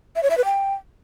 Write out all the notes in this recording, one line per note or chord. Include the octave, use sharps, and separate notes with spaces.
E5
C#5
E5
B4
G5